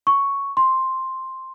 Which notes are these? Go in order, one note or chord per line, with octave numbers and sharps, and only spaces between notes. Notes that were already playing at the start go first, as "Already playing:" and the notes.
C#6
C6